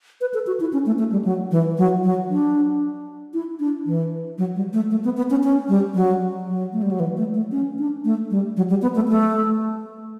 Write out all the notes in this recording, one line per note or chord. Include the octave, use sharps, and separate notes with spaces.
B4
A4
F#4
E4
C#4
A3
A3
G3
F#3
E3
F#3
F#3
D4
E4
D4
E3
F#3
G3
A3
A3
B3
B3
C#4
C#4
G3
F#3
F#3
A3
G3
F#3
E3
A3
A3
C#4
D4
A3
G3
F#3
G3
B3
A3
A3